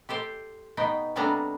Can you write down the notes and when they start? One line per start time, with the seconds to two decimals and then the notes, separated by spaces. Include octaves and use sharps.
0.09 G4 A4 C5 G5
0.77 B2 B3 D#4 G5
1.16 C3 G3 B3 D4 A4 A#5